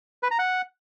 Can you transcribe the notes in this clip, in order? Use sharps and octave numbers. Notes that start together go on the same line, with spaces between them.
B4
A#5
F#5